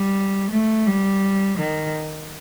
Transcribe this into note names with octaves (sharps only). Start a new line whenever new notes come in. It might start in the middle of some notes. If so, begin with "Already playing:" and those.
Already playing: G3
A3
G3
D#3